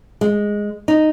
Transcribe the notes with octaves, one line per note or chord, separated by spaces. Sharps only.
G#3
D#4